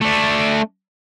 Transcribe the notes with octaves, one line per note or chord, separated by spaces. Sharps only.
A3 D4